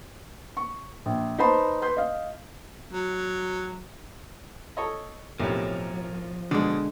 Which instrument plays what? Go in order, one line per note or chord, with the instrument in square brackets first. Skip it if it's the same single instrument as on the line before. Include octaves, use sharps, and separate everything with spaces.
[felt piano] C#6
A#1
D#4 B4 C5 A5 B5 C6
B4 C6 G6
D#5 F5
[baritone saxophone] F#3
[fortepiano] A4 C#5 D#5
[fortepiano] B1 A2 C3 [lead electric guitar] F3 [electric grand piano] A#4 C#5
[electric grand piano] B2 [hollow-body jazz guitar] D3 G#3